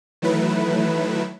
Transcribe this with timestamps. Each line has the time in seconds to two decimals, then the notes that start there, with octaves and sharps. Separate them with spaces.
0.22 D#3 E3 F#3 A3 E4 B4